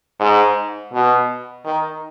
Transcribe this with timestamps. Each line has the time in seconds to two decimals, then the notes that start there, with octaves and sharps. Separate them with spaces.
0.20 G#2
0.93 B2
1.65 D#3